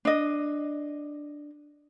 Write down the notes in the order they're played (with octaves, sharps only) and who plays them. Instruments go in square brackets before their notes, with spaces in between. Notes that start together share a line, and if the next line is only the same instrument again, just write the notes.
[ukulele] D4 D#5